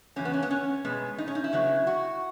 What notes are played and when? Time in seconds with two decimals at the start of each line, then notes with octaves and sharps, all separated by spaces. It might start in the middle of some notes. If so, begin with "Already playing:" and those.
0.16 E2 C#3 F#3 C#4
0.25 B3
0.33 C#4
0.43 B3
0.51 C#4
0.85 B2 G#3 B3
1.18 D#4
1.28 C#4
1.35 D#4
1.44 E4
1.53 C#3 F#3 B3
1.87 F#4